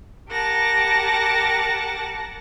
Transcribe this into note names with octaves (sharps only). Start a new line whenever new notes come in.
G4 A#4 F#5 A5 A#6